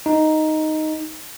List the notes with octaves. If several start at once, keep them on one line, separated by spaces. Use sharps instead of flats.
D#4